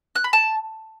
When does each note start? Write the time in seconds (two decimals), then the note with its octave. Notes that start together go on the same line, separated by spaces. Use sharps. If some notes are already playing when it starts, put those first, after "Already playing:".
0.15 F#6
0.24 B5
0.33 A5